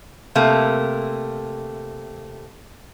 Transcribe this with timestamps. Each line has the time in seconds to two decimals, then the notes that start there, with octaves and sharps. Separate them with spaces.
0.35 C3 A3 A#3